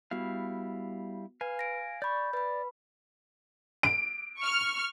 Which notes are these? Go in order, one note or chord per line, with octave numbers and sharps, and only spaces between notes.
G3 B3 E4 F#4 F5
B4 F5 G#5
A#6 D7
D5 B5 C#6 G6
B4 D5 B5
D7
C#6 F6